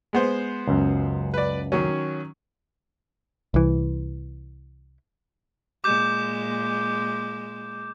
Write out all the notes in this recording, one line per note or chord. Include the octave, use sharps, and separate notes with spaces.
G#3 B3 C5
C#2 F#2
B4 D5
D#3 F#3 C#4
C2 E3
A#2 G#3 D6 G6 E7